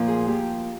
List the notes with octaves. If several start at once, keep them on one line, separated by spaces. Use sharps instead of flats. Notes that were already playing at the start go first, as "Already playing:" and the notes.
Already playing: A#2 F3 A#3
G#4
F3 A#3 G4